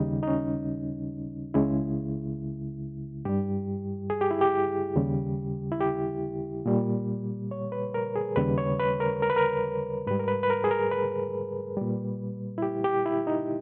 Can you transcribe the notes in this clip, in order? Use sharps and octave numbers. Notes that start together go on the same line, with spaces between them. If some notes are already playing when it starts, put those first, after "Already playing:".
Already playing: D#2 C#3 G3 D#4
D#4
C#4
C#2 C#3 G#3 E4
G2 G3 G4
G#4
G4
E4
G4
D#2 C#3 G3
E4
G4
A#2 G3
C#5
B4
A#4
G#4
D#2 C#3 G3 B4
C#5
B4
A#4
A#4
B4
A#4
G#2 G3 B4
A#4
B4
B4
A#4
G#4
A#4
B4
A#2 G3
E4
G4
G4
E4
D#4